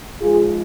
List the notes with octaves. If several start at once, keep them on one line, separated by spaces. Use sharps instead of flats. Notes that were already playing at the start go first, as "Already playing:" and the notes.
G#2 F3 G#3 F4 G#4